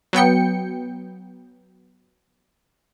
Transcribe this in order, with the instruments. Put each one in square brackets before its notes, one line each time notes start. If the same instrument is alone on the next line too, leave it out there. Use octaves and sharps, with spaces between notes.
[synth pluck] F#3 B3 G5 C#7